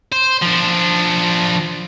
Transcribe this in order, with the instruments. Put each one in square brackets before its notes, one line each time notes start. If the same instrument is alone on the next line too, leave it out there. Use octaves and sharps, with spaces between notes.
[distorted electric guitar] C5
F3 D4